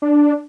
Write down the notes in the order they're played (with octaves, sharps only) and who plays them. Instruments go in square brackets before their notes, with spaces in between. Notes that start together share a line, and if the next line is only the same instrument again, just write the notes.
[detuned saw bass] D4